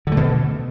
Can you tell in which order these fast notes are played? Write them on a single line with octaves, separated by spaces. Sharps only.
D3 A3 B2